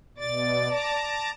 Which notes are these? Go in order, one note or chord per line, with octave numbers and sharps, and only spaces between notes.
B2 D5 A6
A5 A#5 D6